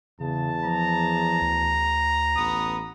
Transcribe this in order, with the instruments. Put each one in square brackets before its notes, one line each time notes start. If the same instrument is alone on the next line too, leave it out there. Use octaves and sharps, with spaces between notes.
[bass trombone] E2 [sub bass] C#3 [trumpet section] A5
[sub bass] F3 [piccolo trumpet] A#5
[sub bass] D2
[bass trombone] A1 [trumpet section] B3 D#6